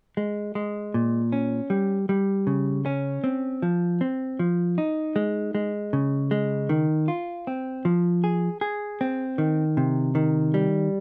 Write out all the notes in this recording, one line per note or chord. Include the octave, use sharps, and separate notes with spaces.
G#3
G#3
A#2
C#4
G3
G3
C#3
C#4
C4
F3
C4
F3
D#4
G#3
G#3
C#3
G#3
D#3
F4
C4
F3
G#4
G#4
C4
D#3
C3
D#3
G3